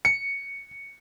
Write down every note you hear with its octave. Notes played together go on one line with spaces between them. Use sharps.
C#7